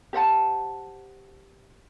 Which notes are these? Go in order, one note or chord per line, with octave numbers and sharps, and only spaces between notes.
G4 C5 F#5 A5